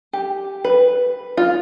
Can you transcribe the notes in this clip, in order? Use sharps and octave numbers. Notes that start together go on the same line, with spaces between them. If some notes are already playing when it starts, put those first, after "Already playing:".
G4
B4
F4